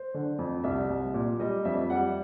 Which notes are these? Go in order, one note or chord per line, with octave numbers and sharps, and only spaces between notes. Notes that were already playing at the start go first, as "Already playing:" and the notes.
Already playing: C5
D3
F2
C2 E5
C2
A#2
G3 D#5
F2 E5
G3 F#5